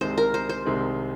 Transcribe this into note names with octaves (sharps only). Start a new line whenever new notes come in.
C2 C3 D#3 G#3 C4 C5
A#4
C5
C5
C2 C3 D#3 G#3 C4